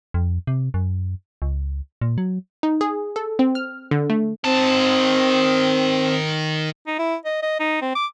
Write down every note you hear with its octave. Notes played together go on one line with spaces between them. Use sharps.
F2
C3
F#2
C#2
A#2
F#3
D#4
G#4
A4
C4
F6
D3
A3
D#3 C4 A5
D#4
E4
D#5
D#5
D#4
C4
D6